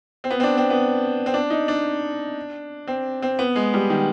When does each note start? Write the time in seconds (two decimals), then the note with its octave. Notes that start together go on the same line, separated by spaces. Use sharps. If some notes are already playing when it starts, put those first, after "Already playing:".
0.24 C4
0.31 B3
0.40 C4
0.43 D4
0.57 C4
0.70 B3
1.26 C4
1.34 D4
1.50 D#4
1.68 D4
2.87 C4
3.22 C4
3.39 B3
3.56 G#3
3.74 G3
3.90 D#3